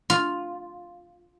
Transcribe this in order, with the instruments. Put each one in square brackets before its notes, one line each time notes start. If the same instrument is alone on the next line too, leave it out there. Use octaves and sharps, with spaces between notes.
[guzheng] F4